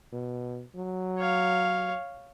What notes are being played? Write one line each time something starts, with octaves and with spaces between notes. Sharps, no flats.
B2
F#3
C#5 F5